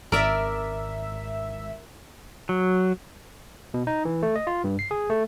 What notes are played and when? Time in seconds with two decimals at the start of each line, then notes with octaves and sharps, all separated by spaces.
0.12 G#1 A#4 D5 E5
2.49 F#3
3.74 B2
3.87 D#4
4.05 E3
4.23 A3
4.36 D#5
4.47 F4
4.64 G2
4.79 C7
4.91 G#4
5.10 A3